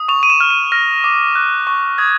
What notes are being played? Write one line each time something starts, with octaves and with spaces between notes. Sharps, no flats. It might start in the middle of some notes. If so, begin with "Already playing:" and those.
Already playing: D#6
C#6 F7
D#7
E7
F6
D#7
F6 A#6
D6
F#6
C#6
D#6 G#6